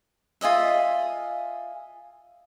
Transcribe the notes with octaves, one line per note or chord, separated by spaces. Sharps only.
F4 G#4 D#5 E5